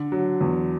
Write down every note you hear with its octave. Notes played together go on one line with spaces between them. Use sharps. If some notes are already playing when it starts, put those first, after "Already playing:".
Already playing: D3
F#3
E2